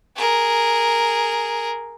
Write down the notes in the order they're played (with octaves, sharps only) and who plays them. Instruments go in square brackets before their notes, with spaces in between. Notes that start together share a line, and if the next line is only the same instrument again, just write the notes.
[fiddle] G#4 A#4